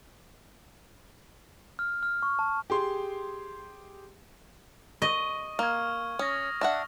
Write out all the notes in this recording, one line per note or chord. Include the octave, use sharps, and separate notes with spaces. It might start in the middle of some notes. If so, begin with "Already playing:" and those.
F6
F6
C#6
A5
G4 G#4 C6
D#5 C#6
A#3 F6 G#6
C#4 D#6 A#6
D4 E5 F#5